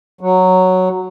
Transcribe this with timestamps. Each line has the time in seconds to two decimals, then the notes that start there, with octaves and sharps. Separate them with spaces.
0.21 F#3